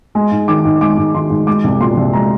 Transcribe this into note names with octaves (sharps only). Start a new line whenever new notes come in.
G#3
G#2
D#3 D6
G#2
G#3 D6
G#2
D#3 C6
G#2
G#3 D6
C2
A#2 C6
C2
G#3 A#5